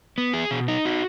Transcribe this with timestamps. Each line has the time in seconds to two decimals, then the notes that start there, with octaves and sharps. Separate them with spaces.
0.18 B3
0.34 G#4
0.51 B2
0.68 D#4
0.85 F#4